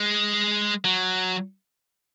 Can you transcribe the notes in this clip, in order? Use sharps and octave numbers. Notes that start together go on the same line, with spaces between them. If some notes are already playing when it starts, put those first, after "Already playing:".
Already playing: G#3
F#3